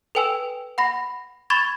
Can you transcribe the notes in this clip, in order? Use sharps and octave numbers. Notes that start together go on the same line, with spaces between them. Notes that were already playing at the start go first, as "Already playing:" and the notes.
A4 B4 G5 G#5 E6 E7
F#5 B5 A#6
B5 C#6 G#6 A6 E7 F7